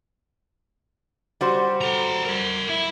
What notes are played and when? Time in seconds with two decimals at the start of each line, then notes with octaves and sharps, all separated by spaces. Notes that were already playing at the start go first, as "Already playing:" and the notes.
1.41 G3 F#4 C5
1.81 A4 A#5
2.25 A#4 F#5
2.69 E4